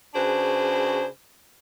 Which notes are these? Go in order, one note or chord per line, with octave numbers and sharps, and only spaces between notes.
C#3 D4 F#4 G#4 B4 C5